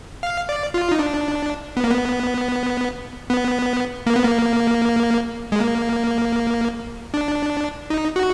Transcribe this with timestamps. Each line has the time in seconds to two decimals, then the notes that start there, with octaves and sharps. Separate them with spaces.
0.23 F5
0.49 D5
0.74 F4
0.91 D#4
0.99 D4
1.77 B3
1.84 A#3
1.91 B3
3.30 B3
4.07 A#3
4.16 B3
4.24 A#3
5.52 G#3
5.60 A#3
7.14 D4
7.90 D#4
8.16 F#4